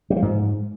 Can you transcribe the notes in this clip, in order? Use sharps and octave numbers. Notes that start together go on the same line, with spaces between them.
G3
F3
G#2